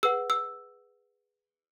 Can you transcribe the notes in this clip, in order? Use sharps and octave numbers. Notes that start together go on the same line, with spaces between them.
G#4 B4 F#5 E6
E6